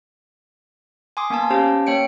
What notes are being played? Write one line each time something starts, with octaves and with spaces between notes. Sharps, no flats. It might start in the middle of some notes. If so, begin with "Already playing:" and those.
G#5 C6 D6 D#6
A#3 B3 G#5 A5
C#4 G4 C5 F5 A5
A#3 C#5 G5 C#7 D7